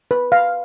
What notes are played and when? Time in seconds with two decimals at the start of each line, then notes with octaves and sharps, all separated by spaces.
0.11 B4
0.32 F5